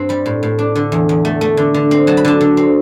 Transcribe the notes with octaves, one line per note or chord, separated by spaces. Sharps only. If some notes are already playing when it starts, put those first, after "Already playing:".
Already playing: G2 C4
G3 B5
A2
A2
D4
D3
E2
E2
A3
A3
D3
D3
C4
F#3 A5
B5
D3 A5
D3
C4